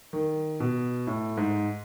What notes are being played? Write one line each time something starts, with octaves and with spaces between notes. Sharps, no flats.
D#3
B2
A2
G#2